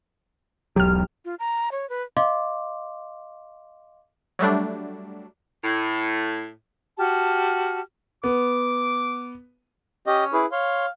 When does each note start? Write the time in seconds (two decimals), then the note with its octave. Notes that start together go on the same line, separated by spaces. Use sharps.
0.76 E1 B1 F#3 G4 F6
1.25 F4
1.39 A#5
1.71 C#5
1.89 B4
2.17 D#5 F5 C6 D6
4.39 F#3 G3 A3 D4
5.63 A2
6.98 F#4 G4 A5 F6
8.24 B3 D6
10.07 C#4 G4 D#5
10.33 E4 G#4 B4
10.52 C#5 F5 C6